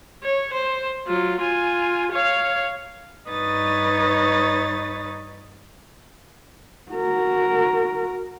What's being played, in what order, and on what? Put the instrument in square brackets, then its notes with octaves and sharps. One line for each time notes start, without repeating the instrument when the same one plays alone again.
[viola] C#5
C5
F#3 F4
F4 G#5
C#5 F5
[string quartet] G2 D#4 B4 C#5 D#6 A6
[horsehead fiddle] F#4 A#4